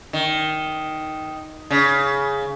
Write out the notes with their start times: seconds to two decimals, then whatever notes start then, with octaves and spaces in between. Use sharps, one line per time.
0.13 D#3
1.71 C#3